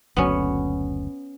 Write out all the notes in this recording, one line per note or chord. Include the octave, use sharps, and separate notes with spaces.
F#1 D2 F#3 B3 C#4